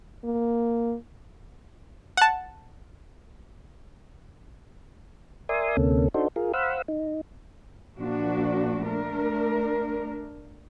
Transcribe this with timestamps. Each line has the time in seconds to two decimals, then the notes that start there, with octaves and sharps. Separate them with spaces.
0.24 A#3
2.17 F#5 A5
5.49 A#4 D5 E5 G#5 C6 D#6
5.77 D2 C3 A#3 C#4 A4
6.14 D4 D#4 F#4 A4 C5
6.36 F4 G#4 A#4
6.54 C5 F5 F#5 B5 E6
6.88 D#4
7.99 A#2 F3 A#3 D4 F#4
8.82 A3 D4 A#4